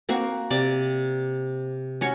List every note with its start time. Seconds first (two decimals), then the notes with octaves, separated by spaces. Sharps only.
0.09 A#3 C4 F#4
0.50 C3 D5 D6
2.01 C#4 F#4 C#5